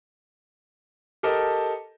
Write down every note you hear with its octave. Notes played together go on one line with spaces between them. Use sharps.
G4 A4 A#4 D#5 A5